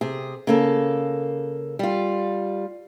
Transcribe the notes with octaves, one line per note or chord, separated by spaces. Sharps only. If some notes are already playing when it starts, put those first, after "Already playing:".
C3 G#4
C#3 A#3 A4
G3 F4